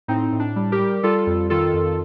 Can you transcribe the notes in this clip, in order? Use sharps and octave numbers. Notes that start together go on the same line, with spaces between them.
A2 C4 D#4
A2
D4
G3
G4 A#4
G3
G3 F4 A4
F2
D#3 F4 A4
F2